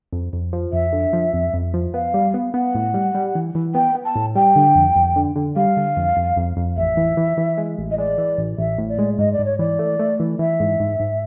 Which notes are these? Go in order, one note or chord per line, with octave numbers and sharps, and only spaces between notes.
F2
F2
F3
F2 E5
D3
F3
F2
F2
F3
B3 F5
G3
B3
B3 F#5
A2
G3
G3
E3
E3
B3 G5
B3
A5
A2
G3 G5
D3
F2
F2
D3
D3
G3 F5
D3
F2
F2
F2
F2
A1 E5
E3
E3
E3
G#3
A1
D#5
G#3 D5
E3
A1
A1 E5
A2
D5
G#3
G#2 D#5
D5
G#2
C#5
E3 D5
A3
A3
E3
E3 E5
G#2
G#2
G#2